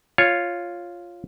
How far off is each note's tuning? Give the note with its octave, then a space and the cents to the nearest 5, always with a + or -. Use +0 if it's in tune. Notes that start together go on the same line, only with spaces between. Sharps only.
F4 +0 C#5 +0